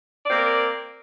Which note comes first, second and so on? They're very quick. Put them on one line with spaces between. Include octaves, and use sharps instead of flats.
D5 C4 A#3 A#4